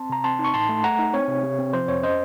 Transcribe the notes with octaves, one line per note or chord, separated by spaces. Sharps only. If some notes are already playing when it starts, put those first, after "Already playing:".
Already playing: C4 A5 C6
C3 A#5
C4 A5 C6
D#4
C#6
A2 A5 C6
A3
A3 F#5 A#5
D#4
C4 C#5
C3
C3
C4
F3 C5
F2 C#5
C#4 C5 D#5